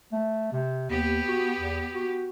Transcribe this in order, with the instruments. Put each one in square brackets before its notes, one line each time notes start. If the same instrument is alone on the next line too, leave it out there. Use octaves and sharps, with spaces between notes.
[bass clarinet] A3
C3
[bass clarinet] D#2 [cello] B3 G4
[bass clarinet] F#4
E2
F#4